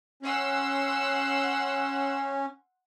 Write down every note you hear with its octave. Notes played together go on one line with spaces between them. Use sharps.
C#4 F#5 C6 E6